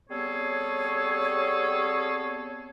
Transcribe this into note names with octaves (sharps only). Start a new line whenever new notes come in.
G3 B3 C4 G#4 A4 C#5